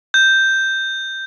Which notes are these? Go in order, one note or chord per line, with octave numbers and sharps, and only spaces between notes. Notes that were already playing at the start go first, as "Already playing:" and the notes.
G6